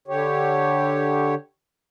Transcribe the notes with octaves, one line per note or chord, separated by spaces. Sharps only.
D3 G4 C#5